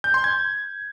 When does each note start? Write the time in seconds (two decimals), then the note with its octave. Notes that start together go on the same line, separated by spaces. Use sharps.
0.04 G6
0.14 C6
0.24 G#6